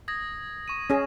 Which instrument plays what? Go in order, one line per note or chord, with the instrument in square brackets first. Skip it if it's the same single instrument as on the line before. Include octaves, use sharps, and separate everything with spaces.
[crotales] D#6 G#6 A#6
C#6 D#7
[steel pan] C#4 G#4